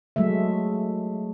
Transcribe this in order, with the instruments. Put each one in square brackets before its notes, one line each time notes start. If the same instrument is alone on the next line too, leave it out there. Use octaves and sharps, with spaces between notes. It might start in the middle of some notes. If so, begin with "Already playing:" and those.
[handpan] F#3 G#3 A3 E5